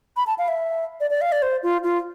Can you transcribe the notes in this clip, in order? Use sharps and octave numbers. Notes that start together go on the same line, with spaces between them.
B5
A5
F5
E5
D5
D5
F5
D5
C5
F4
F4